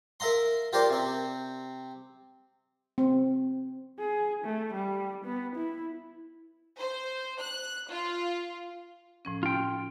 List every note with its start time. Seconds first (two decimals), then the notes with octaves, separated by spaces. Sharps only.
0.20 A#4 E5 F5 A#5 C6
0.73 F4 G4 A#4 C5 D5
0.90 C3 C4
2.98 C4
3.99 G#4
4.45 A3
4.74 G3
5.25 B3
5.56 E4
6.79 C5
7.40 F#6
7.90 F4
9.25 A2 F3 C#4
9.43 F4 G5